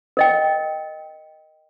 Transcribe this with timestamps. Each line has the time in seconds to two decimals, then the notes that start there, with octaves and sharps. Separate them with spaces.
0.17 A#4 D#5 G5